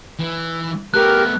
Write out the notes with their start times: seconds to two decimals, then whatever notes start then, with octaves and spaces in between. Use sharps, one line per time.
0.19 E3
0.94 A3 B3 G4 A#4 F#6